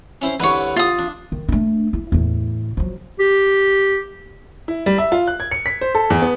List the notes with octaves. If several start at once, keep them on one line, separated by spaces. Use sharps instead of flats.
C#4 E4 C5
C2 D3 B4 C#5
F4 D#6
D4
D#3
A3 D4
E4
E2 A2
F3 F#3
G4
E4
G3
E5
F4
F#6
G#6
C#7
B6
C5
A4
E2
B3